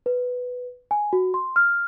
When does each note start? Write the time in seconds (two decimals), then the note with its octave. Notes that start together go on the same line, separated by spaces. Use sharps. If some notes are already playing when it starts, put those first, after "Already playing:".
0.06 B4
0.91 G#5
1.13 F#4
1.34 C6
1.56 F6